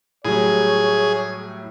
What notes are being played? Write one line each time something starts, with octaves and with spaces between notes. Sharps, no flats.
A2 F#3 G3 G#4 C#5